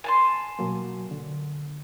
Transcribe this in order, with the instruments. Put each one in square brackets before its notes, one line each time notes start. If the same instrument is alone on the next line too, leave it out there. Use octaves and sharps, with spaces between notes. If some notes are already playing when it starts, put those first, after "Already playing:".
[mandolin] G#5 A5 C6
[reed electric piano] B2 F#3 A#3
D3